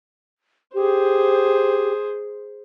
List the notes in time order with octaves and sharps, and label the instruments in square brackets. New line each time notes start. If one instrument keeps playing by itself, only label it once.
[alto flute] G4 [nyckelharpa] G#4 C5